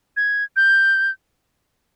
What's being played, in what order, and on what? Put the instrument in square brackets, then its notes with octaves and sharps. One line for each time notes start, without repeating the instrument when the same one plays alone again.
[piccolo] G#6
G6